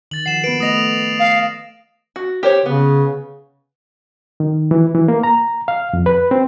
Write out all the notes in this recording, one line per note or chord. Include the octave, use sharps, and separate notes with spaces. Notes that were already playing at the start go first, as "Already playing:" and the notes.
D#3 A6 F#7
F3 F#5 C7 E7
B3 B4 D7
A3 D#5 D#6 A#6 F7
F5
F#4
G4 C5 C#5
C#3 B3
D#3
E3
E3
A#3
A#5
F5
F2
B4
C4